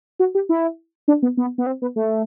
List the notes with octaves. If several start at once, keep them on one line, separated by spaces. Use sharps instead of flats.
F#4
G4
E4
D4
B3
B3
B3
C4
B3
A3